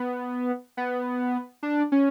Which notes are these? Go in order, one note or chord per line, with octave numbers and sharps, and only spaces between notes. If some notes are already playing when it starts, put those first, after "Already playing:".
Already playing: B3
B3
D4
C#4